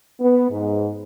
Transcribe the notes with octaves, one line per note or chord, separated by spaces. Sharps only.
B3
G#2